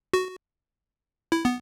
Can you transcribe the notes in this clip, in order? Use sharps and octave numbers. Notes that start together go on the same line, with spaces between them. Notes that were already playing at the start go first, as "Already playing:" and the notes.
F#4
E4
B3